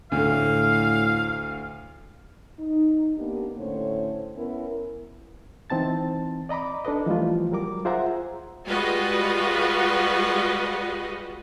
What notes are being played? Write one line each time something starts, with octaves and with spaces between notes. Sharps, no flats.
D2 A2 A3 F5
D#4
A#3 B3 D4 D#4 G4
A2 D3 A3 C#4 C5 C#5
B3 C#4 E4 A#4
E3 C4 D#4 A5 A6
D5 D#5 A#5 B5 D6
D4 A4 B4 D#5
E3 F3 G3 A3 F4
F#3 G3 A#4 D6
F4 G#4 C5 E5 F#5 A#5
G3 G#3 F4 F#4 B4 D#5